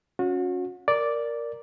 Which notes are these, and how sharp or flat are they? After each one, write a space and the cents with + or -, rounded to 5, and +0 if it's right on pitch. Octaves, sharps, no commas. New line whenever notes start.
C#4 +0 F#4 -35
A#4 +0 D5 -5